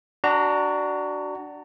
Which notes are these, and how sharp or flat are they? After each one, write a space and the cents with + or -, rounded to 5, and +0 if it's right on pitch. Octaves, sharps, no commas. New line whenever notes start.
D4 +0 F#4 +20 A#5 -20